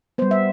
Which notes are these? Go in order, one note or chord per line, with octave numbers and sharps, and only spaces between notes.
G3 B3 C5
E5